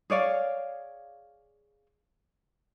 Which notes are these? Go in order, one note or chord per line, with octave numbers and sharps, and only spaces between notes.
G#4 C#5 D5 F5